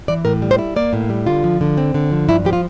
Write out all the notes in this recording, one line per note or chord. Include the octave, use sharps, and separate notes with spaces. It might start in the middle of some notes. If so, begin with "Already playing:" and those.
E3 D5
A2 A#4
G3
C5
E4
A#3 D5
A2
G3
D3 F4
F3
D3
C4
D3
F3
G2 E4
F3 G4
F4